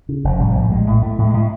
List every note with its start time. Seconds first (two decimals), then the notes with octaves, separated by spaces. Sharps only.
0.09 C#3
0.24 F1
0.40 A2 G3
0.55 A#1
0.71 A2 G#3
0.87 A2
1.02 A2 A3
1.18 A2 G#3
1.34 A2